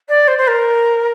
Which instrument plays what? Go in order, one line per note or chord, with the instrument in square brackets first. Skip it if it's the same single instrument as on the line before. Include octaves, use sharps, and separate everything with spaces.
[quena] D5
C5
C5
A#4